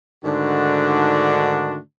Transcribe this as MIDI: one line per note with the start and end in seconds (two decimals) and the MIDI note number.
0.24 1.77 44
0.24 1.77 50
0.24 1.77 51
0.24 1.77 57
0.24 1.77 62
0.24 1.77 66